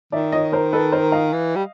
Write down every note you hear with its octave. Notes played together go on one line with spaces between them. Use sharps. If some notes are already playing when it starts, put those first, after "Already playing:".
D#3 D5 E5
C#5 D#5
A#4 C5
A4 B4
A#4 C5
D#5 F5
E3
G3